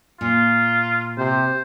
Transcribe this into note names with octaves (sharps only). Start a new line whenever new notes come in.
A#2 F4
C3 C5